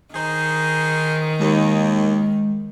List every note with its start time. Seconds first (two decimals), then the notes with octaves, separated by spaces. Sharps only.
0.14 D#3 D#4 G#4 C5
1.39 D#2 G#3